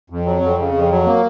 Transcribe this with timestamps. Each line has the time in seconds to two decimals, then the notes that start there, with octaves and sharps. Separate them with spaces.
0.10 F2
0.26 F#3
0.42 F2
0.59 C#3
0.74 F2
0.91 F#3
1.06 A#3